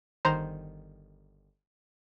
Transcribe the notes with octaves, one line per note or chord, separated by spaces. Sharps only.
G1 D#3 C5 A#5 C6